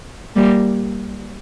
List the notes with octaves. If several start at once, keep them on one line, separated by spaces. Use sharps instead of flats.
G3 A#3